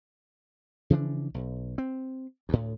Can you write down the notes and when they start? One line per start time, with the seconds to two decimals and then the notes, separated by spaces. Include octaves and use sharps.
0.90 C#3 E3 F3 D4
1.34 B1
1.78 C4
2.49 D2 A2